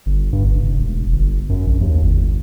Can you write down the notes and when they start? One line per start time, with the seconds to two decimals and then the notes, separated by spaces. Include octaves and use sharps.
0.06 G1
0.33 G2
0.44 G1
0.56 F1
0.80 E1
1.12 G1
1.49 F#2
1.67 A#1
1.81 D#2
2.02 G1